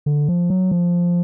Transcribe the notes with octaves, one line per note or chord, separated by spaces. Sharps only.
D3
F3
F#3
F3